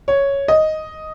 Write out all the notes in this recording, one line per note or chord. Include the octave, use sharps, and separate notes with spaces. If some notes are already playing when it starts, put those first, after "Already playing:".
C#5
D#5